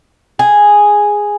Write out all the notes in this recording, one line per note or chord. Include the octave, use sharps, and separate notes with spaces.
G#4